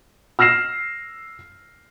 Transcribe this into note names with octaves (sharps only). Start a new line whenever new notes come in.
E6 F6 A#6 C7 E7